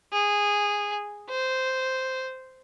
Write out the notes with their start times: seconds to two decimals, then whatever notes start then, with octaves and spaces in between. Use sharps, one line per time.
0.13 G#4
1.30 C5